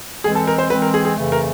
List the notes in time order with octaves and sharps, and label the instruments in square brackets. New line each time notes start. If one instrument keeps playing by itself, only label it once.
[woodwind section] E3 G#3 C4 [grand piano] G#4
[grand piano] A4
A#4
C5
[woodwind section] E3 G#3 C4 [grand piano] B4
[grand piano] A#4
G#4
G#4
[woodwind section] F2 C#3 E3 A3
[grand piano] A#4